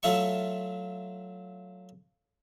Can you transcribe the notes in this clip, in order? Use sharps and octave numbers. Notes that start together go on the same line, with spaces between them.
F#3 A3 F4 E5 A5 C#6